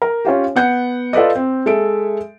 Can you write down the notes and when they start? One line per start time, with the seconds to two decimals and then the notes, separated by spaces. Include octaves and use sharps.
0.02 A#4
0.25 C#4 F4 G4
0.56 B3 F#5 G6 C#7
1.13 F4 A4 B4 D5 D#5
1.35 C4
1.66 G#3 A4 E5 D7